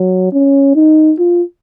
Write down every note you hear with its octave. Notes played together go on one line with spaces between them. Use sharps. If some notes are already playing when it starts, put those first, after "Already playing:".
Already playing: F#3
C#4
D#4
F4